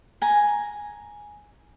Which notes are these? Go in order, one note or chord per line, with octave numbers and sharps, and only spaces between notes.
G#5 A#5